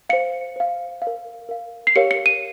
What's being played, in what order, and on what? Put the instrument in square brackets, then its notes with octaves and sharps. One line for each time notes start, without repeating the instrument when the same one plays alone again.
[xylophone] C5 F5 C#7
C5 F5
F5
A#4
A#4 F5
C7
G4 A#4 C#5 F5 C#7
C#7
D#7